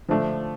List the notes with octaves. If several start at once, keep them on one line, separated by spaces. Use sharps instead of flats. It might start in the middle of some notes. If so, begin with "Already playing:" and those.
D3 F3 A3 D4